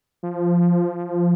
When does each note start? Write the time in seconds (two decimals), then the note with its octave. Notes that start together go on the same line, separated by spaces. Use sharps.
0.23 F3